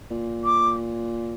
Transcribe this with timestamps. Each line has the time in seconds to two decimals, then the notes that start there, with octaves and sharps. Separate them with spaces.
0.10 A#2
0.44 D6